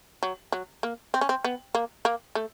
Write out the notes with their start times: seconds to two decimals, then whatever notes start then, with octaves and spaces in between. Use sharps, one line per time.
0.23 F#3
0.52 F#3
0.83 A#3
1.14 C4
1.21 C#4
1.29 C4
1.44 B3
1.75 A#3
2.05 A#3
2.35 A3